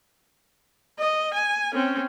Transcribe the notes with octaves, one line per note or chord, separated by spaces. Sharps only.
D#5
G#5
C4 C#4